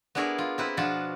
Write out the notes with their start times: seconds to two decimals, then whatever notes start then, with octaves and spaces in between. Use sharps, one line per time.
0.15 B3 D4 E4 G#4 A#4 C#5
0.38 F4
0.58 C4 E4 B4
0.77 B2 F3 D4 F4 F#4 A5